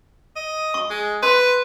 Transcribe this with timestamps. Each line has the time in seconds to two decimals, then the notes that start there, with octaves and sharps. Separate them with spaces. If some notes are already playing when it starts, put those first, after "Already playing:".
0.36 D#5
0.74 C#6
0.90 G#3
1.23 B4 C6